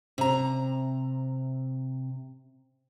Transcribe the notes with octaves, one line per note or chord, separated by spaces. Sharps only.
C3 A#5